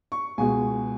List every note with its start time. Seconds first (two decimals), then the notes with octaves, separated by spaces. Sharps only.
0.12 C#6
0.38 C#2 B2 G#3 G#5